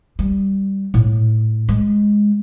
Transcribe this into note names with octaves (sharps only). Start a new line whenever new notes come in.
G3
A2
G#3